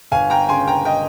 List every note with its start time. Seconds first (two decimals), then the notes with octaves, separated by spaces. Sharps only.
0.12 G1 F5 G#5
0.30 G5 A#5
0.49 C#3 G#5 C6
0.68 G5 A#5
0.85 D#5 G5